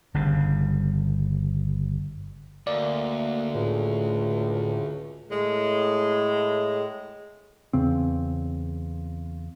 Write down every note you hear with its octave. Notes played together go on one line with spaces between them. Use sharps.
G1 G2 C#3
D2 A#3 D5
C#2 A2
A2 G#3
E2 C#3 C4